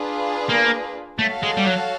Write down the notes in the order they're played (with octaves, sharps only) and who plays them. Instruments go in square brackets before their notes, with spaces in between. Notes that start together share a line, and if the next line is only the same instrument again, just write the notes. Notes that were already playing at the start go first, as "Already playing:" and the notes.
Already playing: [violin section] D4 F4 G#4 B4
[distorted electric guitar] A#3
[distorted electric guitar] A3 [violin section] F#4 A4 C#5 F5
[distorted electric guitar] G#3
G3
F#3